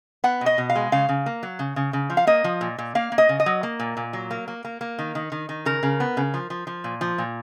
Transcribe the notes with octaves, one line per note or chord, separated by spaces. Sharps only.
B3 F#5
B2
D#5
B2
F5
G#3
C#3 F5
C#3
A#3
F#3
C#3
C#3
C#3
F3
F5
A#3 D#5
F3
A#2
A#2
A#3 F5
A#3
D#5
C#3
D#5
F#3
A#3
A#2
A#2
F#3
A#3
A#3
A#3
A#3
D#3
D#3
D#3
D#3
C#3 A#4
C#3
B3
C#3
F3
F3
F3
A#2
F3
A#2